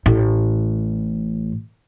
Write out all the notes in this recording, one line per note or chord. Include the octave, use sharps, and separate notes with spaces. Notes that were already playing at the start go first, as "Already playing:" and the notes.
A1 A2